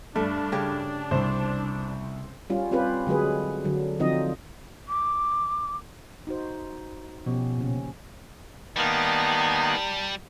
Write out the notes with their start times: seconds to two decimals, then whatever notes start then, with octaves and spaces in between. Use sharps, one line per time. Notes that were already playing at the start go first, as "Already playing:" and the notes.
0.16 G2 A3 D4
0.52 C#3 G4 C#5
1.11 C2 C5
2.50 G3 C#4 F4
2.71 C4 C#4 F4 G4 B4
3.07 D3 F#3 G#3 G#4 B4
3.65 D3 F#3
3.99 D3 F3 F#3 C4 D#4 D#5
4.88 D6
6.27 D#4 F#4 C5
7.26 B2 F3 C#4 G4
7.58 A#2 C#3 C#4
8.77 D#3 G3 A#3 B3 A5